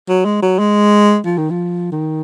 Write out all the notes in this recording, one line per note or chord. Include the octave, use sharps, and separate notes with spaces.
F#3
G#3
F#3
G#3
F3
D#3
F3
D#3